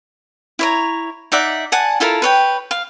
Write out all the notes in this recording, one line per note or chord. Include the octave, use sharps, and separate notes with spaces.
E4 C#5 A#5
D#4 D5 E5 F#5
D5 F#5 G#5 A5
E4 F4 A4 A#4
B4 C#5 G5
F5